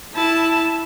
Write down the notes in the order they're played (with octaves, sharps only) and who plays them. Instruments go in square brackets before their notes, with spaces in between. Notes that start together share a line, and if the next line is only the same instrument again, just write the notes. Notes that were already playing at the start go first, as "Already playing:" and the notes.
[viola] E4 A5